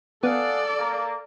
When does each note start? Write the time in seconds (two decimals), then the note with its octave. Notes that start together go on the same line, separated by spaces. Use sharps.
0.23 B3 G#4 A4 D5 F5 F#5
0.79 A#3